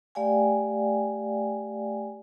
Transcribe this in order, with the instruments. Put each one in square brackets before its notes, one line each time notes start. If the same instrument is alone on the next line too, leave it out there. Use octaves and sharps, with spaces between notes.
[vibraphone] A3 G4 D5 F5 G5 G#5